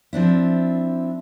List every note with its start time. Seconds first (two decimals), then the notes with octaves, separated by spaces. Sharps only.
0.13 F3 C4 D4 E4